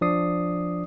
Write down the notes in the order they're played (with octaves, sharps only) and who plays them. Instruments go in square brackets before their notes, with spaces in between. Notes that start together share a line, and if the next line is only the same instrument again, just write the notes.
[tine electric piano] F3 D4 D5 D#6 C7